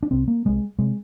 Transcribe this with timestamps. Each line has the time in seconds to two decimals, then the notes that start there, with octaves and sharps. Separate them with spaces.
0.03 D4
0.11 C2 C3 C4
0.28 A#3
0.45 C2 C3 G#3
0.79 C3 G#3